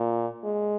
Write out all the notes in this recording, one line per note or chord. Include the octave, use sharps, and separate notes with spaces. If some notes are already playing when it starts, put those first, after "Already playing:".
Already playing: A#2
G#3